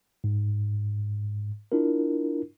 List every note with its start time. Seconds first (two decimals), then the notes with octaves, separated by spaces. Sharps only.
0.24 G#2
1.72 D4 E4 F4 A#4